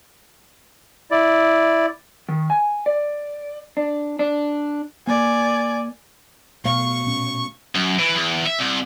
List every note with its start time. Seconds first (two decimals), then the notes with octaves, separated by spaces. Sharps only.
1.11 E4 D5
2.29 D#3
2.50 G#5
2.86 D5
3.77 D4
4.19 D4
5.07 A#3 D5 G#5
6.64 B2 A3 F5 C#6
7.04 A#2 C#4
7.75 F#2
7.99 E3
8.15 E2
8.46 E5
8.59 C2